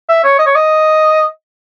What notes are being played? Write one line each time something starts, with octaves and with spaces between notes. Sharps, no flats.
E5
C#5
D#5
C#5
D#5